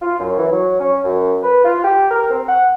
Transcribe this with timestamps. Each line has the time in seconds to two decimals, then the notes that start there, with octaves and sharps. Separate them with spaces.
0.02 F4
0.19 F#2
0.37 E3
0.52 F#3
0.80 C#4
1.05 F#2
1.42 B4
1.65 F4
1.84 G4
2.11 A#4
2.31 C4
2.48 F#5